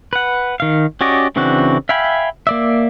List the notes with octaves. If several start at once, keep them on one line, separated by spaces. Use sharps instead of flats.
B4 F#5
D#3 F5
C#4 F#4 G4 D5 D#5
C#3 E3 C4 D4 F#4
E5 F5 G5 G#5 B5
A#3 D5 E5